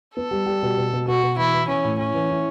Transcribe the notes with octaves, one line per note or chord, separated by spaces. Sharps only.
B3 A4
G3
G3
B2
B2
B2
B2 F#4
B2
E3 E4
E3
E3 C#4
A2
C#4 E4
E3
E4